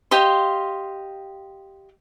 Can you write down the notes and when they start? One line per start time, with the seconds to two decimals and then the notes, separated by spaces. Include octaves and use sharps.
0.11 G4 D#5 F5 C6